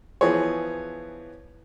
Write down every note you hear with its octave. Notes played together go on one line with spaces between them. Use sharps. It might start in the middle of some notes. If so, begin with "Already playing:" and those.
E3 F3 B3 G#4 C#5